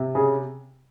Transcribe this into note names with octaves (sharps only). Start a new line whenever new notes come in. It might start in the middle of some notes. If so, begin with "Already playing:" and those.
Already playing: C3
C#3 G#4